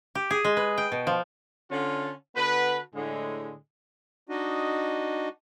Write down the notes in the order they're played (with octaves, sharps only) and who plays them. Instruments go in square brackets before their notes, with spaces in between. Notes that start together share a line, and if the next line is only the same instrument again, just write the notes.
[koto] G4
G#4
G#3
B4
G5
B2
F3
[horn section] D3 C#4 F4
D3 B3 F#4 B4
A2 D3 G#3
[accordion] D4 D#4 F#4 D#5